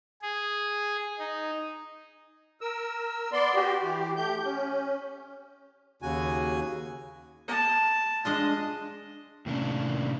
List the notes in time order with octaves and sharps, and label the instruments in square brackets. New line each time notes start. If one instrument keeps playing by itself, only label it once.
[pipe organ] G#4
D#4
[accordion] A#4 E6
B3 D5 C6
F#4 G4
E3 G4
A3 G4 G6
C#4
[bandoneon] D#2 C#3 F#4 G#5
[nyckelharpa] A5
[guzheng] G#3 D4 F4 [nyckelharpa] D#5
[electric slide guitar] A2 C3 D#3 A#3 C#4 D4